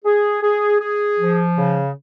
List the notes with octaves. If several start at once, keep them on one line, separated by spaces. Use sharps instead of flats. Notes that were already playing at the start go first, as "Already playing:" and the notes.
G#4
G#4
G#4
F3
C#3